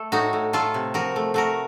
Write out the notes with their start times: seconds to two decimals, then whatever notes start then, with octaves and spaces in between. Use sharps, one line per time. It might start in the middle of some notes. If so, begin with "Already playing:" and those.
Already playing: A3 A4
0.12 A2 D#4 F#4
0.33 A2
0.53 A3 F4 A4
0.74 C3
0.94 F3 F#4 A#4
1.16 A3
1.34 A3 F#4 A#4